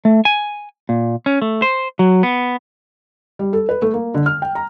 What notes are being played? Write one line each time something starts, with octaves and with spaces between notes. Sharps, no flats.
A3
G#5
A#2
C#4
A3
C5
F#3
B3
G3
A4
B4
A3
A#3
D3
F6
G5
A#5